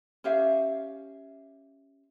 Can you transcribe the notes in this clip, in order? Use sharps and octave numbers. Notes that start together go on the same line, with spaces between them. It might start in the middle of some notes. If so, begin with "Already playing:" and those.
C#4 G4 E5 F5